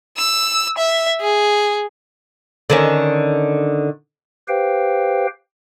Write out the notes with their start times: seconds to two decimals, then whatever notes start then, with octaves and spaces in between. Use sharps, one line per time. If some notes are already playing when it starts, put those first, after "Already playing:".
0.17 E6
0.78 E5
1.21 G#4
2.70 D3 D#3 C#4
4.48 G4 B4 C5 F5 G5